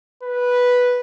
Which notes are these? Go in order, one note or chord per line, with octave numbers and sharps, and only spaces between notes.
B4